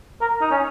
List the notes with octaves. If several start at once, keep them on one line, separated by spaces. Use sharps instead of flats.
A#4
D#4
C#4